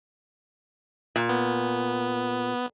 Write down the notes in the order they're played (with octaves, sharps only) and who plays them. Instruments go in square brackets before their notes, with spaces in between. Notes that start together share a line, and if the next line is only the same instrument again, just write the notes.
[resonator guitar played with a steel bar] A#2
[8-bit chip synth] B3